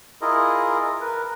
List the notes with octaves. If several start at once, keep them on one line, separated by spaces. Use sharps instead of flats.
E4 F4 G#4 A#4 D#5
A#4 B4